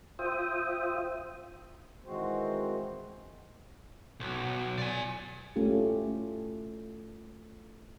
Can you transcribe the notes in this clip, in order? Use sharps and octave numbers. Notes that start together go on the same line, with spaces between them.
F4 C5 E5 G5 D#6
D#3 E3 G#3 C4 F#4 C5
B1
D5 G#5
A3 C#4 F4 G4